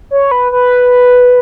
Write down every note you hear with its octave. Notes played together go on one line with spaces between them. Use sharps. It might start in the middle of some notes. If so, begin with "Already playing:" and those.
C#5
B4
B4